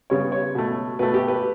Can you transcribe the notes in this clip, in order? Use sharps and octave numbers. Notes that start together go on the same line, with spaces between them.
C#3 G3 B3 C#5
C#5
B2 A3
B2 A3 B4
G4
B4